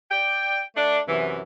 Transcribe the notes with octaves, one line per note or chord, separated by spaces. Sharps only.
D5 G5
A3 D4
F#2 C3 E3